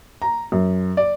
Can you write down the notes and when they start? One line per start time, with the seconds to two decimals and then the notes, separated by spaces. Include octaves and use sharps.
0.22 A#5
0.52 F#2
0.97 D5